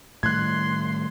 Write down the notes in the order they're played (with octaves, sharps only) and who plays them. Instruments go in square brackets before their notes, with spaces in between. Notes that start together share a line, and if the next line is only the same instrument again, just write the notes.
[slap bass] A2 D#3 G3 [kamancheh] C6 [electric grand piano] F#6 G#6